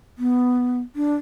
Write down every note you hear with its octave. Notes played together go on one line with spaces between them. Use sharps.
B3
D4